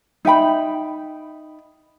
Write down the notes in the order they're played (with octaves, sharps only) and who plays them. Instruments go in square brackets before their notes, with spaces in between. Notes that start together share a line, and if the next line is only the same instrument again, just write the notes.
[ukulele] D#4 E5 G5 B5